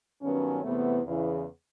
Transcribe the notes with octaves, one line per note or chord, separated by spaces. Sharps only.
G2 D#3 F#3 B3 C#4
E2 C3 E3 A3 B3
E2 C#3 E3